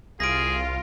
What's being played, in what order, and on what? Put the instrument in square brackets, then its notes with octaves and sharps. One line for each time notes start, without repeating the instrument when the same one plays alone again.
[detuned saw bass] C2 [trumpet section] F4 [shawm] G#4 [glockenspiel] A#6 D7